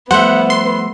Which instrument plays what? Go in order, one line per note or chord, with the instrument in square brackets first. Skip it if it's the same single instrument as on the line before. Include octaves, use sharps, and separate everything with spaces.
[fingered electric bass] F3 G3 A3 [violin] B3 [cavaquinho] C5 E5 [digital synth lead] F#5
[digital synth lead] C6